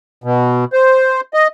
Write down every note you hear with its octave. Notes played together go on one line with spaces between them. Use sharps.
B2
C5
D#5